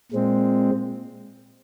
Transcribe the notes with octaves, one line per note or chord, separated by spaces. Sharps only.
A#2 G#3 C4